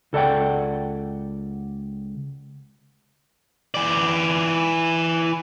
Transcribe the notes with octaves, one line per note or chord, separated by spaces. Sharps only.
C#2 A4 D5 F#5 G5
E3 D5